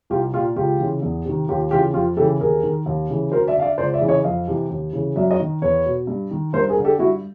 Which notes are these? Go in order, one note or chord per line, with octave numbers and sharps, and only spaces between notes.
C2 F4 G4
A#2 F4 G4
C#2 F4 G4
C#3 E3
E2
C3 D#3
D#2 F4 G4
C#3 E3 F4 G4
F2 F4 G4
C#3 E3 G4 A4
D#2 G#4 A#4
D#3
D#2
C#3 E3
D2 A#4 C5
D5 E5
D3 F5
D5 E5
C#2 C5 D5
D5 E5
C#3 E3
C#5 D#5
F2 D#5 F5
C3 E3
D#2
C#3 E3
F#2 D5 E5
C#5 D#5
D#3
E2 B4 C#5
B2
G2
D#3
G2 A#4 C5
G#4 A#4
D3
G4 A4
G2 E4 F#4